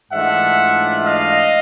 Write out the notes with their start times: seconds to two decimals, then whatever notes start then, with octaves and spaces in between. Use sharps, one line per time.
0.12 G#2 E3 A3 D4 F4 E5 F#5
1.04 D#5 F5